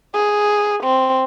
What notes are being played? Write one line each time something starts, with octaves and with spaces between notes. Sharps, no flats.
G#4
C4